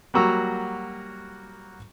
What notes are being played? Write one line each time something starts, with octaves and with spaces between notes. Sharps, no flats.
F#3 G3 A#3 F#4 A#5 E6